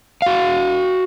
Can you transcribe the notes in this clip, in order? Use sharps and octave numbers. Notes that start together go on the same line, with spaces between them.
F#4 F5